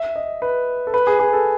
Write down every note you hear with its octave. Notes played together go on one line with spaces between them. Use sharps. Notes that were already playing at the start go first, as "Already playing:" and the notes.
Already playing: E5
D#5
B4
A4
B4
G#4
G#4
A4